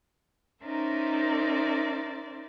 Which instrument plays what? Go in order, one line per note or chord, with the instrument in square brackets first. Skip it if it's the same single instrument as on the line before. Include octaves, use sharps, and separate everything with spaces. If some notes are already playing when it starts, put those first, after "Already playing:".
[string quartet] C#4 D#4 A#4 C5 D5 E5